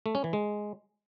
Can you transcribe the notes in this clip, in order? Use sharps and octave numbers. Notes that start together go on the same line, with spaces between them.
A3
C#4
E3
G#3